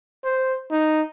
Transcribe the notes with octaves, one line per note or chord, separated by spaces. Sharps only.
C5
D#4